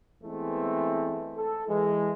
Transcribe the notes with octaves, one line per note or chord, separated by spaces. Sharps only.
E3 G#3 A3 B3 C4 E4
A4
E3 G#3